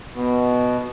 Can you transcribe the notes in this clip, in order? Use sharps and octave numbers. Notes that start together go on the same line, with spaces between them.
B2